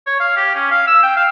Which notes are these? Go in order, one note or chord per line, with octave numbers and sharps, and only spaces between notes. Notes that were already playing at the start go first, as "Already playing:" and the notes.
C#5
F5
G4
C#4
F5
E6
G5
F5